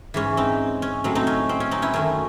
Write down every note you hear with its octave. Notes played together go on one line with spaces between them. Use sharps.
G#2 E3 G#3 C#4
C4 D#4
C#4
A2 F#3 A3 C4
C4 D#4
C#4
C4
C#4
C4 D#4
C#4 E4
F#2 D#3 A3 C#4